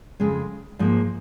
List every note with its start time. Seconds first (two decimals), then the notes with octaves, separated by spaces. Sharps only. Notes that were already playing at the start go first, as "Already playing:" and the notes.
0.20 F2 C#3 G#3
0.79 G#2 F3 A#3